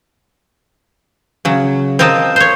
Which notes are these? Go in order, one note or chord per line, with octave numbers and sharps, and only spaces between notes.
C#3 F#3
C4 F4 A#4 D#5 A5
C5 C#5